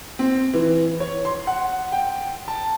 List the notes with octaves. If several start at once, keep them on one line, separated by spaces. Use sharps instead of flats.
C4
E3
C#5
C6
F#5
G5
A5